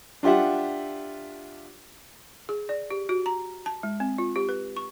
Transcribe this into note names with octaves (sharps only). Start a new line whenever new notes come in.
D4 F4 G4 E5 F#5
G#4
D5
G4
F#4
A#5
A5
G#3
C4
F4
G4
B4
C#6